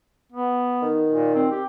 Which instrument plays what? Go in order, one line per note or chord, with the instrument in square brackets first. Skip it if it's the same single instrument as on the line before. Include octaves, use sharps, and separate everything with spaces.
[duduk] B3
[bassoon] D#3
[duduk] A#2
C4
G4